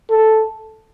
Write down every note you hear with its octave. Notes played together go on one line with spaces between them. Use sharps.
A4